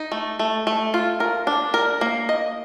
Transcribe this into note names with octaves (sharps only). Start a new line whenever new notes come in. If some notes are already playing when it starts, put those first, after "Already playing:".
Already playing: D#4
A3
A3
A3
F4
A#4
D4
A#4
A#3
D#5